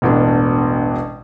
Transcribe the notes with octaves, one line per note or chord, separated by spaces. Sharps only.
E1 A1 B2 D4